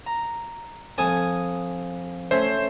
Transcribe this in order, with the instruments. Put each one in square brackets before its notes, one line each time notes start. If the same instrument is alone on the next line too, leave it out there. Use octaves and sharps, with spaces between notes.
[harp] A#5
[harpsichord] F2 A5 [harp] G#5 D#6
[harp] A3 C#4 E5 [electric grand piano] C5